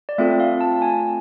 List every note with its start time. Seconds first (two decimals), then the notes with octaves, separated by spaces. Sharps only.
0.09 D5
0.18 A3 C4 F4 A4 E5
0.40 F5
0.61 A5
0.82 G#5